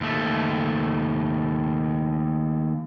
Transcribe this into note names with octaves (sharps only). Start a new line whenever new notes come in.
D#2 A3